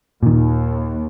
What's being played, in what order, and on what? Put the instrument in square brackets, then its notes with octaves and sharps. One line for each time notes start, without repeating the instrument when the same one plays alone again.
[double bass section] D#2 [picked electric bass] A#2 D#3